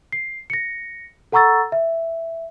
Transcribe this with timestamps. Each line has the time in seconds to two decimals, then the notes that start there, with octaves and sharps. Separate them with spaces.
0.12 C7
0.50 A#6 C#7
1.32 A4 F#5 A#5 C#6 E6 A6
1.72 E5